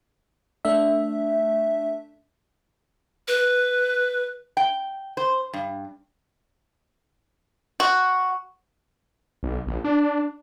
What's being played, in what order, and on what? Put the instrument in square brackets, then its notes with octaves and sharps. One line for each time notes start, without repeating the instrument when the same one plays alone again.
[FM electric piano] A3 D4 E5
[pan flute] B4
[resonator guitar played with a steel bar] G5
C5
G2
[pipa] F#4
[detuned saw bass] B1
A#1
D4